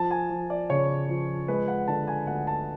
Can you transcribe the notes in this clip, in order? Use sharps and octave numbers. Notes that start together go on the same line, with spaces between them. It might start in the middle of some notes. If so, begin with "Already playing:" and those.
Already playing: F3 A5
G#5
F3
D5
C#3 C#5
F3
G#3 B4
F#5
D3 A5
G#5
D2 F#5
A5